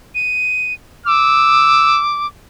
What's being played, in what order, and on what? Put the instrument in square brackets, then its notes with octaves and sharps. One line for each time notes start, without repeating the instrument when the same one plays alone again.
[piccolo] D#7
[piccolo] D6 [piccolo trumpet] E6